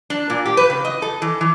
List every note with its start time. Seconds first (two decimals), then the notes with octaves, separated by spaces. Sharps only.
0.10 D4
0.30 A#2
0.46 G4
0.57 B4
0.70 C#3
0.85 D#5
1.02 A4
1.22 E3
1.41 E3